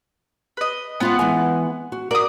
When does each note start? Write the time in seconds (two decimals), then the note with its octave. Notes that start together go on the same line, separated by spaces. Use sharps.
0.57 B4 D#5
1.00 G#3 B3 C4 F4 F#5
1.19 E3 G#3 G#5
1.92 F#4
2.11 F#4 A#4 D5 D#6